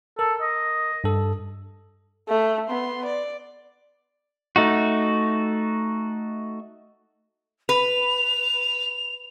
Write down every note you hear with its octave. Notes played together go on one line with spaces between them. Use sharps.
A4 A#4
D#5
G2 A4
A3
B3 C6
D5
A3 D#4 F#4
B4 F7